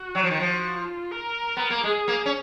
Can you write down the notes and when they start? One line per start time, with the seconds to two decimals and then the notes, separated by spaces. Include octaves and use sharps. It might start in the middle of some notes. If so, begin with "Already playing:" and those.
Already playing: F#4
0.15 F#3
0.23 F3
0.31 D#3
0.39 F3 F#4
0.75 F4
1.11 A#4
1.57 B3
1.70 A#3
1.83 G#3 G#4
2.08 A#3
2.26 C#4